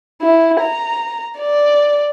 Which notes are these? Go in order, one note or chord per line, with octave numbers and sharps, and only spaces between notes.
E4
A#5
D5